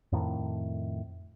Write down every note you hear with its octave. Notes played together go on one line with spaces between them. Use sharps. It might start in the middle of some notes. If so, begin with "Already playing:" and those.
F2 A2 D#3